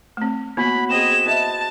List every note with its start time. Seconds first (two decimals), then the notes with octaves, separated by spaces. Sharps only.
0.17 A3 C4
0.57 A#3 B3 F#4 C#5 B5
0.90 C4 G#4 D#5 E7
1.26 B4 D#5 E5 A5